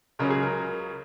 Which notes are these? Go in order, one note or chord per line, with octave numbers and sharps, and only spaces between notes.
C#2 C#3 F#3 C#4 A#4
G#4
A#4